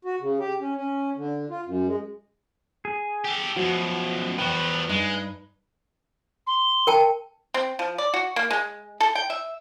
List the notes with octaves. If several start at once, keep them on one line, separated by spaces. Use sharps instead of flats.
F#4
C#3
G4
C#4
C#4
D3
F4
F#2
G#3
G#4
G4 A4
F#2 B2 F3 F#4
E2 F3 F#4 B4 G5
G2 G#3 D#4
C6
A#4 G5 A5
C4
F3
D5
F#4
A#3
G#3
A4
G5
E5